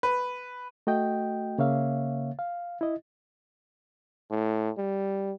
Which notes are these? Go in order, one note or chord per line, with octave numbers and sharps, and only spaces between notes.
B4
A3 F#4 D#5 G5
C#3 A#3 C#5 E5 F5
F5
E4 D#5
A2
G3